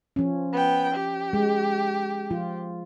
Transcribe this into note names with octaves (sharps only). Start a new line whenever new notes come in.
F3 C#4
B3 G5
G4
G#3
F3 F4